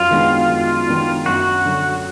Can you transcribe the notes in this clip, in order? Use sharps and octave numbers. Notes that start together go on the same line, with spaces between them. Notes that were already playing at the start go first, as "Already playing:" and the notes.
Already playing: F#2 F4
D#3 G#3 B3 D4
F#2
D#3 G#3 B3 D4
F#2 F#4
D3 F#3